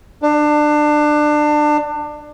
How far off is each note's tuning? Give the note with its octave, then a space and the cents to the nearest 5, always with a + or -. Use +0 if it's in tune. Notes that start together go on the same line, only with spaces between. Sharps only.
D4 +25